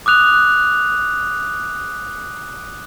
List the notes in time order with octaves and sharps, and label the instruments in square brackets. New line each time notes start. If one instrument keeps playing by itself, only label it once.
[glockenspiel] D6 D#6 F#6 F7